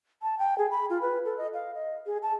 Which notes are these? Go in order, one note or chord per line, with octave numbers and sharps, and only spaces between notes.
A5
G5
G#4
B5
F4
B4
A4
D#5
F5
D#5
G#4
A5